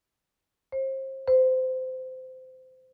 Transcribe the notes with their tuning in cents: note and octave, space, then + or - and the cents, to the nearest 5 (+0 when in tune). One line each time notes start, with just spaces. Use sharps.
C5 +30
C5 -25